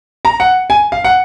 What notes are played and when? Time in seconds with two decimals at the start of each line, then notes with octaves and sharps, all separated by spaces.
0.25 A#5
0.40 F#5
0.70 G#5
0.92 F5
1.04 F#5